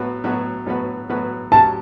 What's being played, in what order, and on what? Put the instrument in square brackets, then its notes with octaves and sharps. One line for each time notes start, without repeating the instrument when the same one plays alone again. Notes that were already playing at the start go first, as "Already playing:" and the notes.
Already playing: [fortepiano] A2 F#3 B3 F#4 B4
A2 F#3 B3 F#4 B4
A2 F#3 B3 F#4 B4
A2 F#3 B3 F#4 B4
[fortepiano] A2 F#3 C#4 G4 [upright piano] A5